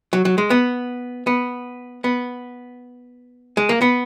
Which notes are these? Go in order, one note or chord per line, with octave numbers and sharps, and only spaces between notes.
F#3
F#3
G#3
B3
B3
B3
G#3
A#3
B3